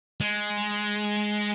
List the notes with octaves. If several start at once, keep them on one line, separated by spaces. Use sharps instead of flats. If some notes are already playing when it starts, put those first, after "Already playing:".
G#3